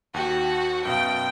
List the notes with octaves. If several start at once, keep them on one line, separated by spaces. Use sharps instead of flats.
D#2 F#4 G5
F#2 B2 F5 G5